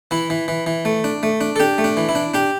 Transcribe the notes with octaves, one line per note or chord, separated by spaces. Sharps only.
E3 E4
E3
E3
E3
A3
D4
A3
D4
A4
D4 G4
A3
D4
E3
E4
D4
D4 G4